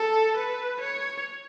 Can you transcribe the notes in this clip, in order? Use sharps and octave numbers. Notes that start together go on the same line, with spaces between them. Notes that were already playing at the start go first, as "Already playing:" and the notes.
Already playing: A4
B4
C#5